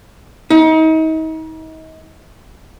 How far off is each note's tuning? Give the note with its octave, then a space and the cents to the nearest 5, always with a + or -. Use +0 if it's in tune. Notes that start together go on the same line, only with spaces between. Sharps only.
D#4 +35